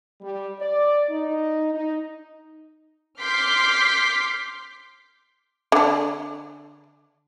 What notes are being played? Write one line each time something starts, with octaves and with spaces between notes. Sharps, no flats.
G3
D5
D#4
D#4
C6 D6 F6 G6 B6 C7
D3 D4